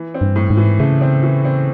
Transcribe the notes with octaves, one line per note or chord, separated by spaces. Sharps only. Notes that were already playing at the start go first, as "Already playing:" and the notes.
Already playing: E3
C4
G2
A2
G#2
E3
C#3 A3
C4
E3
C4